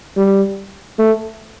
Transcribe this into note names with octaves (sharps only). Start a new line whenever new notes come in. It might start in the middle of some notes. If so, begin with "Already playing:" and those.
G3
A3